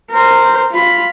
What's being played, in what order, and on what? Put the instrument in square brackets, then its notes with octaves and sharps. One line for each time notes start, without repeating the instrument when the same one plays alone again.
[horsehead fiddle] A#4 C5
F4 B5